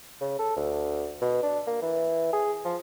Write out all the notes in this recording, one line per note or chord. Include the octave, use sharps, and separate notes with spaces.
C#3
A4
D2
B2
D4
A#3
E3
G#4
F3